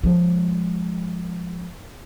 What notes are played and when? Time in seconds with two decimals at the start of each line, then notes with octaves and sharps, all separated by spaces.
0.04 F3 G#3